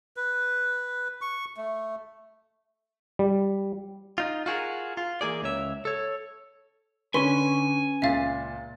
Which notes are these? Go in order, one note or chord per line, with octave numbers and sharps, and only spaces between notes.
B4
C#6
A3
G3
D#4 F4
F4 F#4 G#4 A#4
F4
E3 A#3 G#4 D5
C#2 C#5 E5
A4 C#5
D3 C#4 B4 G#5 C6 C#6
C#2 A#2 E5 F5 A6